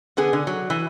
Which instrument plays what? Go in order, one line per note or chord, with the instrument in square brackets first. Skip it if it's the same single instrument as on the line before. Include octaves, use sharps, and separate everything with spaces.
[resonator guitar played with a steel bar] D3 B3 G#4
D3
F#3
E3